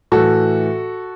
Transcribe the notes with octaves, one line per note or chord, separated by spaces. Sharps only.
A2 E3 F#4 A4